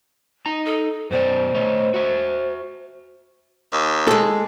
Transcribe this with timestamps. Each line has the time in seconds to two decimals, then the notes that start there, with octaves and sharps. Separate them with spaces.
0.46 D#4 A#5
0.66 A4
1.11 F#2 B2 C5 D5
1.54 A3 C#5 D#5
1.94 F#4 E5
3.73 D#2
4.07 G#3 A4